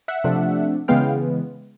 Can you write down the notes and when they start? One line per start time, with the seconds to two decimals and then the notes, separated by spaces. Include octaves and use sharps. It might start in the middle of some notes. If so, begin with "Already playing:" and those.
0.08 E5 F#5
0.24 C3 F3 A3 D4
0.88 C#3 E3 G#3 B3 F5 G5